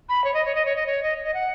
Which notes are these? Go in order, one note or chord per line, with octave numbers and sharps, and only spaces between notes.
B5
C#5
D#5
C#5
D#5
C#5
D#5
C#5
D#5
D#5
F#5